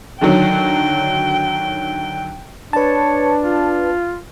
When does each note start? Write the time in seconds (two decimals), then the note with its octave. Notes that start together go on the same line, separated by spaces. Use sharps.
0.21 D3 D#3 F#3 G5
2.73 D4 B4 C#5 A5
3.43 F4